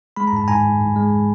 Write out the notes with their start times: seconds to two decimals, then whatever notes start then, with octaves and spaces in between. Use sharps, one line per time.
0.16 G#3 B5
0.27 A#5
0.33 G#2 A5
0.48 G#2 G#5 A#5
0.65 G#2
0.81 G#2
0.96 G#3